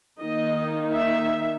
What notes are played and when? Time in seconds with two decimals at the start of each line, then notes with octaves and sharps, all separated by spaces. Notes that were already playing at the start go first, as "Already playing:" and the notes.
0.19 D#3 A#3 D#4 D#5
0.94 E5